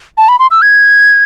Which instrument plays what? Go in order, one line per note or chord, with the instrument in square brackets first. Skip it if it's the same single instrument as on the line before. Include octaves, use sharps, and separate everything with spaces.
[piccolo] A5
B5
C6
E6
G#6